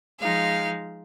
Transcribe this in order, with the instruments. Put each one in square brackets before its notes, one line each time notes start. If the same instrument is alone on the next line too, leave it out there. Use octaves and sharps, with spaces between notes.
[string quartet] F3 G#3 D#4 F5